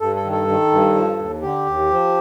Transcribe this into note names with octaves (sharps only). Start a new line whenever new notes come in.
G2 A4
A4
D#3
A4
D#3
G2
F3
D#2
D3 G4
D#2
F3